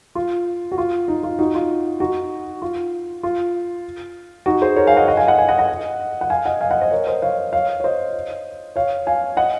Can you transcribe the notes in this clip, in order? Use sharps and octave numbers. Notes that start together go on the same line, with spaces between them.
F4
F#4
F4
D#4
F4
D#4 F#4
F4
D#4 F#4
F4
F4
D#4 F#4
G#4 C5
A#4 C#5
F5 G#5
D#5 F#5
D#5 F#5
F5 G#5
D#5 F#5
F5 G#5
D#5 F#5
D#5 F#5
F#5
F5 G#5
D#5 F#5
F5 G#5
D#5 F#5
C5 D#5
A#4 C#5
C5 D#5
C#5 F5
C#5 F5
C#5
C5 D#5
C#5 F5
F5 G#5
D#5 F#5